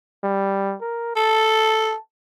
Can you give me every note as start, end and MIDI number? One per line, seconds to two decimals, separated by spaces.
0.24 0.76 55
0.81 1.16 70
1.16 1.93 69
1.16 2.00 81